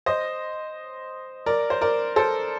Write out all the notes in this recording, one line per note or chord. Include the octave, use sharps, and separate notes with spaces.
C5 D#5
A#4 D5
C5
A#4 D5
A4 C5